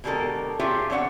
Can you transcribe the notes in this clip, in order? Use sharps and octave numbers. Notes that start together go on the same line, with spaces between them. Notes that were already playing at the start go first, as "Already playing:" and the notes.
B2 D3 G#3 G4 A4 A#4
F4 G4 G#4 C#5 E5 G5
E3 C4 D4 C#5 F#5